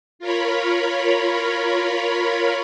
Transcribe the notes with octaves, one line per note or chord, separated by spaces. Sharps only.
F4 A#4 C#5 B5